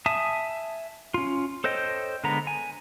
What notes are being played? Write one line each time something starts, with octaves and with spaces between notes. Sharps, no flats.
E5 G#5 A5 D#6
C#4 F4
A4 C5 C#5 D#5 G5
D3 G#3 B3 A#5
G#5